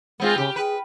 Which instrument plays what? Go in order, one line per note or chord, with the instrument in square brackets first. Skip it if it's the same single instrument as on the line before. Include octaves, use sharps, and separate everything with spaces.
[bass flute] G#3 [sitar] B3 C4 F4
[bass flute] C#3 [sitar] G4
[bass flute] G#4 [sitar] B4